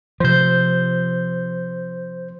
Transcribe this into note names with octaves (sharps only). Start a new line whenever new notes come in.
C3 F3 C5 G6